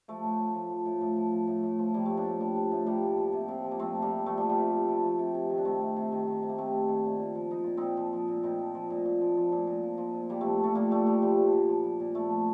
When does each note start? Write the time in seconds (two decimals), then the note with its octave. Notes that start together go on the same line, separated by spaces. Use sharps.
0.08 F3 A3
0.23 A2
0.39 A2
0.55 F3
0.70 F3
0.86 A2
1.01 A2
1.16 F3
1.32 F3
1.48 A2
1.63 A2
1.79 F3
1.94 F3 G3 A#3
2.05 A2 A3
2.17 A#3 D4
2.25 A2
2.40 F3 G3
2.56 F3
2.72 A2
2.86 A2 G3 A#3
3.03 F3
3.17 F3
3.33 C3
3.48 C3
3.64 F3
3.71 A#3
3.79 F3 A3 C4
3.95 C3
4.02 G3 A#3
4.10 C3
4.26 F3 A3
4.38 F3 G3
4.49 G3
4.58 C3
4.72 C3
4.88 F3
5.04 F3
5.19 C3
5.34 C3
5.49 D#3
5.58 D4
5.65 D#3 A3 C4
5.81 C3
5.96 C3
6.12 D#3
6.27 D#3
6.43 C3
6.49 A#3
6.58 C3 A3 C4
6.73 D#3
6.88 D#3
7.05 A#2
7.19 A#2
7.35 F3
7.51 F3 D#4
7.64 A#2 F4
7.77 A#2 C4 D#4
7.97 F3
8.13 F3
8.28 A#2
8.43 A#2 C4 D#4
8.59 F3
8.75 F3
8.90 A#2
9.05 A#2
9.21 F3
9.37 F3
9.52 A#2
9.67 A#2
9.83 F3
9.98 F3
10.14 A#2
10.29 A#2 G3 A#3
10.40 F3 A3 C4
10.60 F3 A3
10.75 A#2 G3 A#3
10.91 A#2 A3
11.06 F3 G3
11.22 F3 G3
11.38 A#2
11.53 A#2
11.69 F3
11.84 F3
12.00 A#2
12.14 A#2 A3
12.30 F3